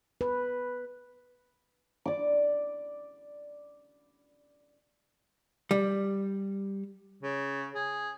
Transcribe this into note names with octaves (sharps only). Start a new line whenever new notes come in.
B4
D5 D6
G3
C#3
G#4